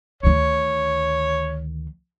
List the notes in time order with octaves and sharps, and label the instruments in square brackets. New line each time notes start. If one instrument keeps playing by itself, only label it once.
[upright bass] D2 D#3 [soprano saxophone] C#5